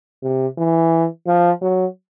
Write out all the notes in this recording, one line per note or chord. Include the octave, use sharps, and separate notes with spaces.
C3
E3
F3
F#3